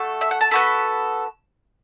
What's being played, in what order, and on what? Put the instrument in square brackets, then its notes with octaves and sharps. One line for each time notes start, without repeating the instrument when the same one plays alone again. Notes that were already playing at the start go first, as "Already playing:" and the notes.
Already playing: [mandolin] A3 F#4 A4
E5
F#5
A5
B3 F#4 A4 B5